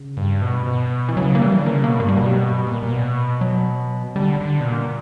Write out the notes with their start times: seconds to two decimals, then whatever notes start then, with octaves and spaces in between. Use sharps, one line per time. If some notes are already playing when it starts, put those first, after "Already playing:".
Already playing: C#3
0.17 G2
0.42 B2
0.66 B2
1.09 E3
1.17 C#3 F#3
1.35 A#3
1.41 E3 G3
1.52 E3
1.59 D3
1.66 C#3 A#3
1.83 B2 A#3
2.00 G2 A#3
2.08 G3
2.16 B2 F#3
2.26 G3
2.67 A#2
2.82 A#2
2.91 B2
3.41 F#3
4.16 D3 G3
4.41 D3
4.60 B2
4.66 A#2